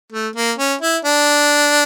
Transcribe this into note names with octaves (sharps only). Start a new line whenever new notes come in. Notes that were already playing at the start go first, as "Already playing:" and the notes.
A3
A#3
C#4
E4
D4